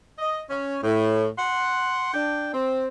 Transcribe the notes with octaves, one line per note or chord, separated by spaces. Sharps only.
D#5
C#4
A2
F#5 C6
D4 G5
C4